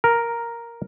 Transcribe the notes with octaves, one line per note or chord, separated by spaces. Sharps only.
A#4